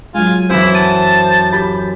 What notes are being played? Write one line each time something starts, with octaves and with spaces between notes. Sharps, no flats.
F#3 G#3 F4 G#5
F#2 E3 E4 C5
F#5 A5 D#7
G4 B5 G6